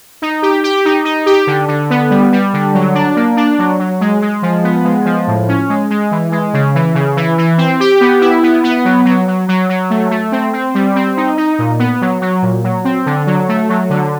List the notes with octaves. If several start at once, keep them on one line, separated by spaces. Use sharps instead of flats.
D#4
G4
G4
D#4
D#4
G4
D3
D3
B3
G3
G3
D3
F#3
D4
A#3
D4
F#3
F#3
G#3
G#3
F3
B3
G#3
F3
A2
C#4
G#3
G#3
E3
G#3
C#3
E3
C#3
E3
E3
C4
G4
B3
E4
B3
B3
F#3
F#3
F#3
F#3
F#3
A3
A3
C4
C4
G3
C4
D#4
D#4
A#2
B3
F#3
F#3
A#2
F#3
C4
D3
F#3
A3
F#3
D3